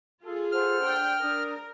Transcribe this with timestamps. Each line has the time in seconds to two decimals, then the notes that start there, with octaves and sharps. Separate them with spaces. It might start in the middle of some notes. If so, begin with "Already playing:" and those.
0.23 F4 G#4 A4
0.52 A4 C5 F#5 F6
0.82 D4 G5
1.21 D4 A#4 D#6